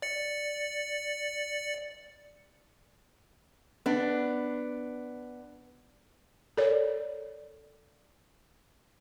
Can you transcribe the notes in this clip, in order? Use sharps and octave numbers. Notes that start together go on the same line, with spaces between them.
D5 C#7
B3 D4
A4 A#4 C#5 D5